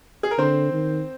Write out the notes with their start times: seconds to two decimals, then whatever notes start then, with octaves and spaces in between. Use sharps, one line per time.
0.23 G#4
0.31 A#4
0.38 D3 C4 C5
0.72 D#3